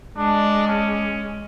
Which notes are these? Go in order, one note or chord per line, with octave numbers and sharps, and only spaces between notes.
G#3 D4
C#4